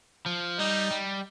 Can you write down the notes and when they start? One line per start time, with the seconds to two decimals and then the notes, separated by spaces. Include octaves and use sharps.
0.26 F3
0.59 G3 D#4
0.91 G3